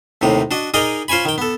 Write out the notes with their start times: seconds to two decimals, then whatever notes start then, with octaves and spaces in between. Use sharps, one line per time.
0.21 D#2 A2 C3 D#4
0.51 D4 F#4 D#5
0.74 D#4 G#4 A#4 D5 D#5 G5
1.08 F4 C5 C#5 G#5 B5
1.25 D#3 G5
1.38 B3 A4